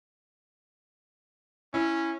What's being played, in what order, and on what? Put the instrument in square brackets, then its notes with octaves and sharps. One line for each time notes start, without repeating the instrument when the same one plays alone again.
[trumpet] C#4 [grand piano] E4